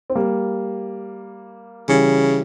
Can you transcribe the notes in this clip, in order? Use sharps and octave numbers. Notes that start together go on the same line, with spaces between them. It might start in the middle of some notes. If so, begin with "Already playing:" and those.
C4
G3 A#3
C#3 E3 G3